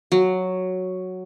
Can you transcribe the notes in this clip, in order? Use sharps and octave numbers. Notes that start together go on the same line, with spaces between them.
F#3